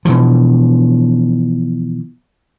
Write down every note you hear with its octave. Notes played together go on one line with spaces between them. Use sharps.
B2 E3 F3